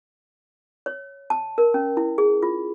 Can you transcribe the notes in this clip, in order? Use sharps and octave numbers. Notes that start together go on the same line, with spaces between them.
C#5
A5
A#4
C#4
E4
G#4
F4